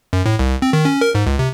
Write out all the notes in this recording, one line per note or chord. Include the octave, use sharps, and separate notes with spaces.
F#2
A2
C2
C4
D#3
C#4
A#4
G#2
C#2
C3